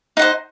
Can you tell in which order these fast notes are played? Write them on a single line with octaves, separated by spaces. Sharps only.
D#4 F#5 C5